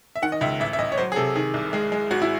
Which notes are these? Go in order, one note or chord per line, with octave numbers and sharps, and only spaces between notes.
E5
D#3 F#5
D#5
C#2 E5
A1 E5
E5
A1 D#5
C#5
F#3 C5
G#4
C3 A4
D#3 G#4
C2
G#3 G#4
G#3
G#1 F#4
E4